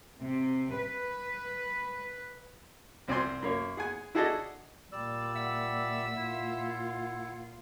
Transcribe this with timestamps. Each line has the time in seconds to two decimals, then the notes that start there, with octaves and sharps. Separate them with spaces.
0.20 C3
0.76 B4
3.08 C2 C4 D5 G#5 C6
3.42 F#2 A#3 C#5
3.77 G#4 F#5 G#5
4.15 E4 F#4 G#4 A4 D5 D#5
4.92 A#2 G3 D5 E6
5.36 E5 F#5
6.16 A#2 E4 F4